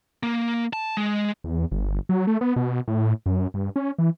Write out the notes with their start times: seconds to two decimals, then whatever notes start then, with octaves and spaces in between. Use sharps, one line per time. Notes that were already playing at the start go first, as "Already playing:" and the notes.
0.23 A#3
0.73 A5
0.97 G#3
1.44 E2
1.72 G1
2.09 F#3
2.27 A3
2.41 B3
2.56 B2
2.88 A2
3.26 F#2
3.54 G2
3.76 C#4
3.99 E3